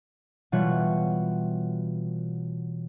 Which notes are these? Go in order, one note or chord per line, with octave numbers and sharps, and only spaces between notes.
B2 E3 G3 F4 C#5 F#5